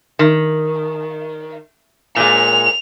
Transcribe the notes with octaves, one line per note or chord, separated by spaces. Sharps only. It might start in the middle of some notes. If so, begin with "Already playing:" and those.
D#3
A#2 G#3 F7